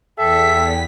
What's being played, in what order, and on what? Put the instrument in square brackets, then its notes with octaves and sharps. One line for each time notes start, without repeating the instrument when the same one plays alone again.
[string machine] E2 B6 [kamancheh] A4 [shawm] E5 [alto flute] G5